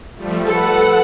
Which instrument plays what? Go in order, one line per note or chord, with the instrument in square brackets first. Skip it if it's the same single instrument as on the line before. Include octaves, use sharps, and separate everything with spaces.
[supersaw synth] F3 G3 A3
[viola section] A4 B4 [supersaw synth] F#5